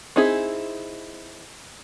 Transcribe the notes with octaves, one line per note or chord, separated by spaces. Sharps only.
C4 D#4 E4 G#4